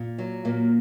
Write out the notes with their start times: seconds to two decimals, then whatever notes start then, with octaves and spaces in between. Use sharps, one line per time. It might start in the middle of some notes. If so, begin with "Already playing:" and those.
Already playing: A#2
0.18 F#3
0.45 A#2 A#3